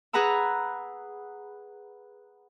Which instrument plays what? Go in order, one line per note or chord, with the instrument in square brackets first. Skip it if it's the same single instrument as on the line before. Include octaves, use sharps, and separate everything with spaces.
[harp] G#4 B4 F#5 A#5 B5 E6